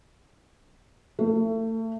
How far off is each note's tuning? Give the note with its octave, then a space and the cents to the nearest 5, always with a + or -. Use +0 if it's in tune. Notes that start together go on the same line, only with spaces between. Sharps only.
A3 +30